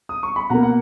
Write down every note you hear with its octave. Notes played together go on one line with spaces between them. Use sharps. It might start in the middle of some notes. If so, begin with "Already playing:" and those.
D#6
C#6
B5
B2 A#3 F#5 A#5
F#5